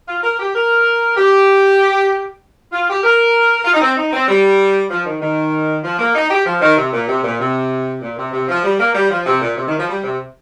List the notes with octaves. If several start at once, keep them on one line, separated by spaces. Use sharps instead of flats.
F4
A#4
G4
A#4
G4
F4
G4
A#4
F4
D#4
C4
D#4
C4
G3
F3
D#3
D#3
F3
A#3
D#4
G4
F3
D#3
C3
A#2
C3
A#2
C3
A#2
C3
C3
F3
G3
A#3
G3
F3
C3
A#2
C3
D#3
F3
G3
C3